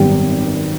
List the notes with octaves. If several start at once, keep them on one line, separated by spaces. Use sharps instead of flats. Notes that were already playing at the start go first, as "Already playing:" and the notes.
Already playing: G#1 F#2 D#3 G3 B3 G4